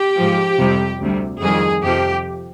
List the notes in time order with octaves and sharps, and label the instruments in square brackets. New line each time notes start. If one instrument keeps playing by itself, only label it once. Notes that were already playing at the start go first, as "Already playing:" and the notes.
Already playing: [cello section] G4
G#2 F3
F2 C3 G3
D2 C3 G3
F2 D#3 G3 G#4
F2 C3 F3 G4